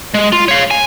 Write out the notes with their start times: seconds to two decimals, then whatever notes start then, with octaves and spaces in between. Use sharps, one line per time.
0.14 G#3
0.33 F4
0.48 C#5 F5
0.71 G#5